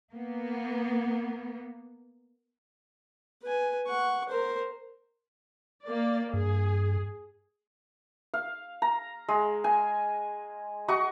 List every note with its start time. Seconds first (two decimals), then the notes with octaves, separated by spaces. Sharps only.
0.12 A#3 B3
3.43 B4 G#5
3.87 F#5 C#6
4.29 A#4 C5
5.83 A#3 D5
6.34 G2 G#4
8.34 F5
8.82 A#5
9.29 G#3
9.64 G#5
10.88 F#4 D#5 C#6